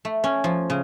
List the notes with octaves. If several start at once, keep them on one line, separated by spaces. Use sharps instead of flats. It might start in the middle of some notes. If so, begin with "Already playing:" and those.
A3
C#4
F3
C#3